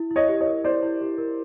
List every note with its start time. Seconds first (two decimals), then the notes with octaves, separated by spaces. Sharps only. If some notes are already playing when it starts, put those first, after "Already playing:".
Already playing: E4
0.11 E4
0.16 C#5 D#5
0.28 G4
0.41 C#5 D#5
0.46 A#4
0.64 E4 C5 D5
0.82 E4
1.01 G4
1.18 A#4